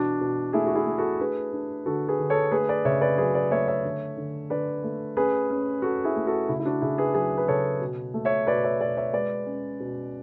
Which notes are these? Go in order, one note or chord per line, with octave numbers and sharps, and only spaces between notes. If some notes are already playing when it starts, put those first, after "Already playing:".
Already playing: B2 E3 D4 F#4
B2
A3 E4 G#4
F#4
E4 G#4
A3
F#4 A4
D4 G#4 B4
D4
D3 F#4 A4
G#4 B4
D3
A4 C#5
A3 G#4 B4
B4 D5
C#3 C#5 E5
B4 D5
F#3 G#4 B4
B4 D5
A3 C#5 E5
C#5 E5
D3
D3
D3 B4 D5
A3
C#4 G#4 B4
C#4
C#4 F#4 A4
E4 G#4
A3
F#4 A4
C#3 E4
E4
D4 F#4
C#3 E4 G#4
G#4 B4
F#3 G#4 B4
B4
C#3 A4 C#5
B2
A3
C#5 E5
B2 B4 D5
C#5 E5
B2 B4 D5
C#5 E5
G#3 B4 D5
C#4
B2